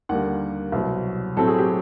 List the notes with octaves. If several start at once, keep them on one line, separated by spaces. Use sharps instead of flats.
D#2 D3 G3 A#3 F#5
C2 B2 F#3 C5
A2 F#3 A3 C4 A4
G#4
G4